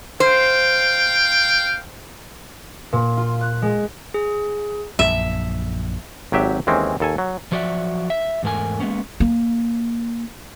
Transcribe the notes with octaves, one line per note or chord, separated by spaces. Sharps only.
C5 F5 G5
A#2
F4
F#6
G#3
G#4
A#1 F#2 E5
G#1 F#3 G4 E5 G5
D#2 E3 G#3 C4 C#4
D#2 A4 G#5
F#3
F3 F#3 F#4 D5 E5
E5
E2 G#2 A3 A#4 G#5
G#3 A#3 B3 C#4
A#3